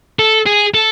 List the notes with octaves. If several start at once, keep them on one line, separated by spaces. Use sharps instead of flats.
A4
G#4
A4